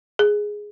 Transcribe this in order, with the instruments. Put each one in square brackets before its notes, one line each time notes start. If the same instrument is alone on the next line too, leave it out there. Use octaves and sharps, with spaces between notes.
[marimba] G#4